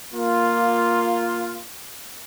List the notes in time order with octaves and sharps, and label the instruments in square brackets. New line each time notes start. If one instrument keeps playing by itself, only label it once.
[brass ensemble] A#3 F4